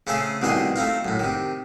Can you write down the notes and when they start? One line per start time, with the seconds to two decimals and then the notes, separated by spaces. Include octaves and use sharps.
0.07 C#3 A3 C4 G#4 A4
0.42 C2 B2 D#3 A3 G#4 C6
0.76 A3 C4 D#4 F4
1.05 F#2 A2
1.20 C3 D#3